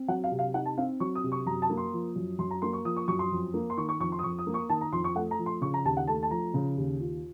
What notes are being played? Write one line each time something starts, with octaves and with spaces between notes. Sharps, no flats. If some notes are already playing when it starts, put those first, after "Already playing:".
Already playing: C4
F#3 F#5
F5
C3
F5
D#4 F#5
A5
C4 F5
F#3 C#6
D#6
C3
C#6
F#2 A#5
A5
A#3
C6
F3
F#2
F#2 C6
A#5
A#3 C6
C#6
F3 D#6
C#6
F#2 C#6
C6
F2
A#3
C6
D#3 C#6
C#6
F2 C#6
C6
D#6
F2 C#6
D#6
A#3
C#6
D#3 A5
A#5
F2 C6
C#6
A3 F#5
A#5
F3
C6
C#3 C#6
A#5
D#2 A5
F#5
A3 A5
A5
F3 A#5
C#3
D#2
F4